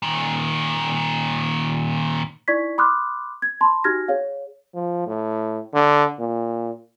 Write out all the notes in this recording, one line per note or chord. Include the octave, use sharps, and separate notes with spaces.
A#2 D#3
D#4 E4 D5 C#6 G#6 B6
B5 C6 D6 D#6 F6 F#6
G#6
A5 B5 C6
D#4 F#4 G4 F6 G#6 A#6
G#4 C#5 F5
F3
A2
D3
A#2